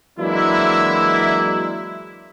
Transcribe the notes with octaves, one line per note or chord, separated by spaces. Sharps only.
E3 F#3 G#3 A#3 D4 E4